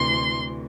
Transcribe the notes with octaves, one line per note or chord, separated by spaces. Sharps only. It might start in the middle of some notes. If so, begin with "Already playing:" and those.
Already playing: D2 C3 E3 C6